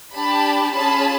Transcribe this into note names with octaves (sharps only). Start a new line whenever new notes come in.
D4 G4 A5 B5
C#4 F4 G#4 A5 B5